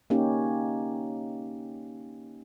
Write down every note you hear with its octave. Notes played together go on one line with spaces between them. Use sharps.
A#3 C#4 D#4 G4